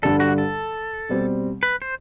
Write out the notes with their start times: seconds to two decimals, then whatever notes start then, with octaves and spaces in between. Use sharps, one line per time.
0.02 G2 D3 G3 D4 A4
0.20 F#4
0.38 A4
1.09 B2 G3 C4
1.63 B4
1.82 C5